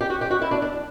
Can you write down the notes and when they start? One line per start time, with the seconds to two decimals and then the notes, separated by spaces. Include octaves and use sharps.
0.01 G4
0.10 F#4
0.21 G4
0.31 F#4
0.42 E4
0.51 D4
0.62 D4